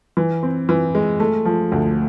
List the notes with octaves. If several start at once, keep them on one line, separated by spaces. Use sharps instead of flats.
E3
C4
E3
G#3
A3
F3
D2